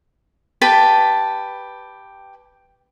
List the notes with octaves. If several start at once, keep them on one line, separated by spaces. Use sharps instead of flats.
G4 B4 A5 B5